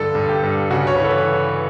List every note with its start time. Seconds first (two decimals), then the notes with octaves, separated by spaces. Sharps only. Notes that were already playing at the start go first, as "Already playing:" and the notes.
Already playing: G2 D3 A4
0.15 G2
0.29 G4
0.43 G2
0.70 C#3 F#4
0.87 C#5
0.95 B4
1.00 E3 A4